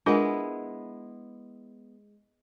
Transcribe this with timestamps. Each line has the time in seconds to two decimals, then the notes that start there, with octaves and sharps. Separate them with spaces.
0.06 G#3 B3 D4 E4 F4 A#4